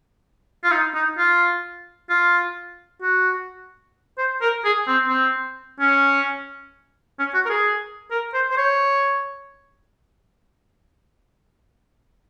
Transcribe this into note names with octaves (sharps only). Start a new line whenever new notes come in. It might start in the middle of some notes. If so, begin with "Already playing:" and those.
F4
D#4
D#4
F4
F4
F#4
C5
A#4
G#4
C4
C4
C#4
C#4
F#4
A#4
G#4
A#4
C5
C5
C#5